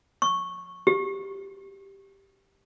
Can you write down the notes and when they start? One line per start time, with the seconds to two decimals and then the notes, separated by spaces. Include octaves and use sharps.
0.22 C#6
0.87 G4